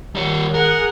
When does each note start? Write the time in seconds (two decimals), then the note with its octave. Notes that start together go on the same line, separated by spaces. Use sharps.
0.15 D#3 G3 C#5
0.54 G#4 A#4 F#5